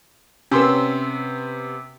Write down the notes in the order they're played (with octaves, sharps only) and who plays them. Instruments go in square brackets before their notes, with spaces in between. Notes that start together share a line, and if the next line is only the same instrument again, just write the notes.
[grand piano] C3 B3 [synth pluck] C#4 C6 E6